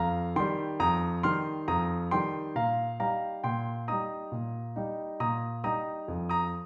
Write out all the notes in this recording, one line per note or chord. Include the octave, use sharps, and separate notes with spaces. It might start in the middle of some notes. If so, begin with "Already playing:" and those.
Already playing: F2 F5 A#5
D#3 G3 G5 C6
F2 A#5 D#6
D#3 G3 C6 F6
F2 A#5 D#6
D#3 G3 G5 C6
A#2 F5 A#5
G3 D#4 F5 A#5
A#2 G5 C6
G3 D#4 A#5 D#6
A#2
G3 D#4
A#2 A#5 D#6
G3 D#4 A#5 D#6
F2
A#5 D#6